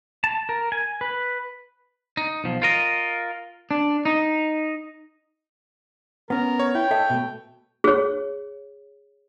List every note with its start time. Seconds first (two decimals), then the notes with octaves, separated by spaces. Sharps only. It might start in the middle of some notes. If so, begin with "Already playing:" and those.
0.24 A5
0.49 A#4
0.72 G#5
1.01 B4
2.17 D#4
2.44 B1 F3
2.62 F4 A#4 D#5
3.71 D4
4.05 D#4
6.30 B3 C#4 A#4
6.60 C#5
6.75 E4 G5
6.91 A4 D#5 E5
7.10 B2 A3
7.84 G#4 C#5